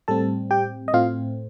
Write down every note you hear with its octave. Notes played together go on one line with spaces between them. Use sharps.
A2 G3 C4 A4 A5
G4 G5
D#5
A2 A3 C4 F4 F5